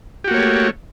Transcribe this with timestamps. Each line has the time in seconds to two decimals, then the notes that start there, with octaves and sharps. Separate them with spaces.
0.24 G4
0.28 F#4
0.31 A#3
0.34 C#5
0.37 A3